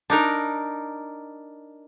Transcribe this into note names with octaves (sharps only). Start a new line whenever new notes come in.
D4 D#4 A#4